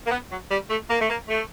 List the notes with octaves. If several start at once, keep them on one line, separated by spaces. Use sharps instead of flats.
A#3
B3
F#3
G3
A3
A#3
A3
A#3
A3